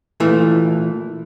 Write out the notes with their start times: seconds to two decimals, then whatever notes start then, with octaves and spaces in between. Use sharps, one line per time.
0.20 A#2 E3 A3